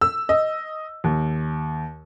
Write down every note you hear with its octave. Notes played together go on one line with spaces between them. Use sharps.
E6
D#5
D#2